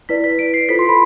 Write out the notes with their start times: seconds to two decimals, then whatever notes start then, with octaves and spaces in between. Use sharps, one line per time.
0.09 E4 B4 D5 B6
0.24 B6
0.39 D7
0.54 C7
0.69 F4 A4 C5 B6
0.79 C6
0.89 B5